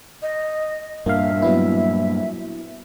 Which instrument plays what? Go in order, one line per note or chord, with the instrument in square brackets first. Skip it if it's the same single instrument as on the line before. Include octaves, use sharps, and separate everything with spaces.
[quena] D#5
[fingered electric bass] G2 A#2 [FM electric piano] A#3 F5 [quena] E5
[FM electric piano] F#3 B3 E4